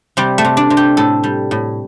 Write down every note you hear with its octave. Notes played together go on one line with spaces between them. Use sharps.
C3 G3
A3
C3
D4
C3
G4
A2 A4
G3
A2